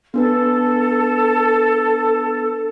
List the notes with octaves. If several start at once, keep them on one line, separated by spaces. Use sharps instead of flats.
B3 D4 A4 B4